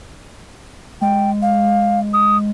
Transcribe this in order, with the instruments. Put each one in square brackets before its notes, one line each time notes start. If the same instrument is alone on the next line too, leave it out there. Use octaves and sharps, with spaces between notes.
[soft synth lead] G#3 [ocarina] G5
[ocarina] F5
D#6